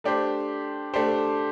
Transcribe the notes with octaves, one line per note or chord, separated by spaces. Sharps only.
A3 D4 G4 C5
A3 D4 G4 C5